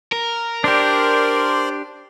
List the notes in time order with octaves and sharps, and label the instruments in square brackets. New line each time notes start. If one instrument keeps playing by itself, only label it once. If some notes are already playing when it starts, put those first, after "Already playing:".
[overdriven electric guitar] A#4
[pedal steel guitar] D4 G4 [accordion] C5 D5 C6